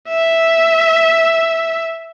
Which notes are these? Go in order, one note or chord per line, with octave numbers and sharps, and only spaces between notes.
E5